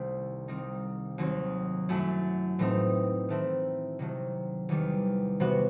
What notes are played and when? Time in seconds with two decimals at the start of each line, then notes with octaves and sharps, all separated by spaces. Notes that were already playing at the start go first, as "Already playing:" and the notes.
Already playing: C2 D#3 A3 C4 E4
0.48 D#3 G3 C4 D#4
1.18 D#2 D#3 F#3 C4 D#4
1.89 F#2 F#3 A3 E4
2.59 A2 E3 A3 C4 D#4
3.29 D#3 A3 C4 E4
3.99 C3 D#3 F#3 A3
4.69 E2 D#3 G3
5.40 C3 E3 B3 F#4